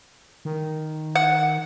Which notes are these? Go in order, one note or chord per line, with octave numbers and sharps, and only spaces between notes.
D#3
F#5